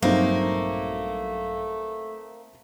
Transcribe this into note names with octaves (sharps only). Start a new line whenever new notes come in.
A#1 G2 F#3 A3 A#3 C4 D#4